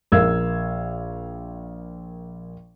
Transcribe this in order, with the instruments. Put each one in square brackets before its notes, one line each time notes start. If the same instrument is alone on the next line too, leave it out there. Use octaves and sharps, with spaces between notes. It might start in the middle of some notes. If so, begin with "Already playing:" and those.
[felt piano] A#1 A#4 F5 E6 G#6